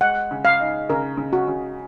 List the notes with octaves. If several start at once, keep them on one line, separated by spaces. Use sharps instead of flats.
G#3 F#5
C#3
F5
D#4
C#3 A#4
C#3
F#4
C#3